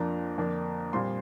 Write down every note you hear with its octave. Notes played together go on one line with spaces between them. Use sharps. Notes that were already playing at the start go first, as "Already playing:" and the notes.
Already playing: F2 F3 A#3 D4 A#5
F2 D3 A#3 D4
A#2 G3 C4 C6